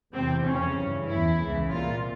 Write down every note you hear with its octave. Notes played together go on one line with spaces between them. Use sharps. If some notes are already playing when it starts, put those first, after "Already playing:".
E2 C3 E3 C4
F2 C#3 E3 C#4
G2 E3
E2 E3 E4
C#2 C#3 E3
C2 A#2 F4